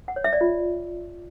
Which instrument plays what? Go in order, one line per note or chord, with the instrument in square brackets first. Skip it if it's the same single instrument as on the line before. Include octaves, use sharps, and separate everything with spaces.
[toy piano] F#5
C#5
E5
D5
F4